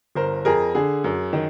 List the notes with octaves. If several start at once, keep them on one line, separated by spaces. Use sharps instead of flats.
G1 A#4 C5
F2 G#4 A#4
D3 G#4
F#2
D#3